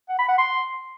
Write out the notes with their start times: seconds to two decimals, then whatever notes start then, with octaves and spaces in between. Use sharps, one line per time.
0.09 F#5
0.19 B5
0.28 F#5
0.38 C6